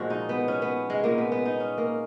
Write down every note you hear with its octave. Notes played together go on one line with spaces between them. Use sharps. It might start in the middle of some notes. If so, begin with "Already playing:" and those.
Already playing: A#2 F3 G#3 F#4
D#4
B3
C#4
B3
G#3
A#2 G#3 A#3
B3
B3
D#4
C#4
A#3